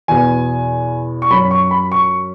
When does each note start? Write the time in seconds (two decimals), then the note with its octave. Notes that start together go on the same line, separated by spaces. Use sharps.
0.08 E2 B2 B3 G#5
1.22 C#6
1.30 F#2 F#3 C#4 B5
1.51 C#6
1.71 B5
1.92 C#6